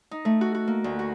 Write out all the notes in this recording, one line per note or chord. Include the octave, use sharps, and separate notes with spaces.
D#4
A3
F#4
F#4
A#3
D2
F#4